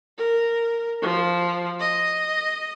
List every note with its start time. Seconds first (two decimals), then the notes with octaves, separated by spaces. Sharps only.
0.17 A#4
1.02 F3
1.80 D#5